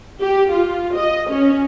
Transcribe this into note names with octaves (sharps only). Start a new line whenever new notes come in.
G4
F4
D#5
C#4